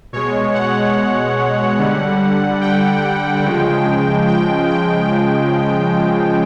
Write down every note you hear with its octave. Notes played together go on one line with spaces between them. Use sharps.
B2 G#3 C#5
F#5
D3 G3
G5
C#3 F3 G#3
G5
G5